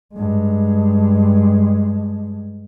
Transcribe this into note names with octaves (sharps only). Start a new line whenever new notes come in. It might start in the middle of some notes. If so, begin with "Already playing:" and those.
G2 G#3